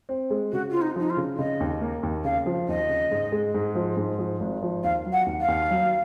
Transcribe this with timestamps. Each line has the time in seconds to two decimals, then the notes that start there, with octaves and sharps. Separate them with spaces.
0.09 C4
0.30 G#3
0.52 C#3 F#4
0.71 C4 F4
0.82 D#4
0.96 F3 D#4
1.10 F4
1.17 C#3
1.38 C#3 D#5
1.60 D#2
1.81 A#3
2.03 D#2
2.24 C#3 F5
2.46 F3
2.68 D#2 D#5
2.89 C#3
3.11 G#2
3.32 G#3
3.54 G#2
3.75 F3
3.97 G#2
4.19 F3
4.40 G#1
4.63 F3
4.84 D#2 F5
5.06 F#3
5.13 F#5
5.26 D#2
5.41 F5
5.48 D#2
5.71 F#3